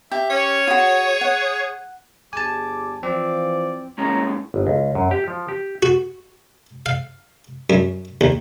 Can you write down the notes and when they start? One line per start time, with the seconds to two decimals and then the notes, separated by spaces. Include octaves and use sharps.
0.12 G4 E5
0.30 C#4 C#5
0.67 F4 F#4 G#4
1.21 F#5
2.33 G1 G3 G#4 G#5 A5 D6
3.03 E3 F3 C4 D5
3.98 A2 G#3 A#3 C#4 A#5
4.54 G1
4.67 C#2
4.95 F#2
5.11 G4
5.28 F3
5.48 G4
5.83 F#4
6.86 F5
7.70 F#2
8.21 D#2